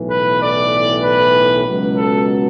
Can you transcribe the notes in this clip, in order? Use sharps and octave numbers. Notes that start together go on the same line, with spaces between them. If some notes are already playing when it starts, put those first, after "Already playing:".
Already playing: B1 A2 E3
B4
D5
B4
C#2 B2 F#3
A4